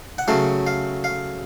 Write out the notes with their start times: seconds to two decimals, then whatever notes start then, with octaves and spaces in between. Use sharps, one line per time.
0.18 F#5
0.28 C#3 F#3 A3 F5
0.67 F5
1.04 F5